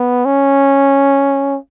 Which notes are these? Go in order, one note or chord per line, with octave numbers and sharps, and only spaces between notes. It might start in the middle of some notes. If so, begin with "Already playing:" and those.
Already playing: B3
C#4